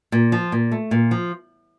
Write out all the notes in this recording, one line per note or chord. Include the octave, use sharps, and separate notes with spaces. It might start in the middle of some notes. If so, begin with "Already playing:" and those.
A#2
F3
A#2
A3
A#2
F3